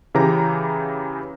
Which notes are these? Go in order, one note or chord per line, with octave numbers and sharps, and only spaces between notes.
C#3 E3 G4 A#5